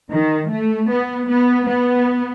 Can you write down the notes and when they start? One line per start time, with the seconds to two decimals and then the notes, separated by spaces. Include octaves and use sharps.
0.11 D#3
0.50 A3
0.90 B3
1.28 B3
1.67 B3